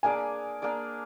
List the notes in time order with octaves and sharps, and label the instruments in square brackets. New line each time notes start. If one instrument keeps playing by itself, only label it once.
[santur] A#3 D4 G#4 D5 [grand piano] G#5
[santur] A#3 D4 G#4 D5